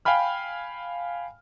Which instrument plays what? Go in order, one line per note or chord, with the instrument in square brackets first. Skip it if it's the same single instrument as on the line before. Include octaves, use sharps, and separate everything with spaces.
[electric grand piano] F5 G5 G#5 B5 F6